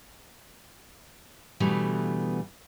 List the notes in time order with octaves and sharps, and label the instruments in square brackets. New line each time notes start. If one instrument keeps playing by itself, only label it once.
[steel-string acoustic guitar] B2 D3 E3 G3 A3 B3